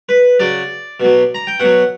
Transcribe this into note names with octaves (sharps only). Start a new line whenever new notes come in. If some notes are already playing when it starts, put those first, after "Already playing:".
B4
C#3 F#3 D5
B2 F#3
A#5
G5
B2 F#3 F#5